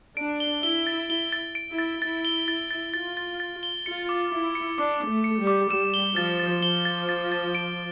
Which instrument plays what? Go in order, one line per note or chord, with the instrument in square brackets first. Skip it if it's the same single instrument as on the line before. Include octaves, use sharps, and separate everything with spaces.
[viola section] D4 [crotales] D7
[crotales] G7
[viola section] E4 [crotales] G7
[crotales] A6
[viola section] E4 [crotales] G7
[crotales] A6
D7
[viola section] E4
[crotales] A6
[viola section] E4 [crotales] A6
[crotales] G7
[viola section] E4 [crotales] A6
[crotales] A6
[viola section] F4 [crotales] A6
[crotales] A6
A6
G7
[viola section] F4 [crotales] C#7
[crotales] D6
[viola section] E4 [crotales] D6
[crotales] C#7
[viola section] D4 [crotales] D6
[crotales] D6
[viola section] A3
[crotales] C#7
[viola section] G3
[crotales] D6
[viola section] G3 [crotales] E7
[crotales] G7
[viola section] F3 [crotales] A6
[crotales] A6
[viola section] F3 [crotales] G7
[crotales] A6
A6
A6
D7